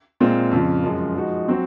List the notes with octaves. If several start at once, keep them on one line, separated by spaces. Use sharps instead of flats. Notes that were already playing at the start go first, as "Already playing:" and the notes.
A#2 G#3 C4 F4
F2 C#3 F3
F#2 F3 G#3
F3 G#3 D#4 F#4
F#3 C4 F#4